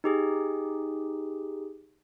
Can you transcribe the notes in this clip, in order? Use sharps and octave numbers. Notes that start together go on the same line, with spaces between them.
D#4 G4 G#4